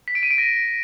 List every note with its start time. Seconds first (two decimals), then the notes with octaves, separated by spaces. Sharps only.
0.08 B6
0.15 D7
0.23 D#7
0.30 D7
0.38 A#6